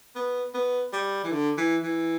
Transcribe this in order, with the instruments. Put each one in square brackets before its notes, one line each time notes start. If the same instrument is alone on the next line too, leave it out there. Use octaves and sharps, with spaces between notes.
[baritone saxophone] B3
B3
G3
E3
D3
E3
E3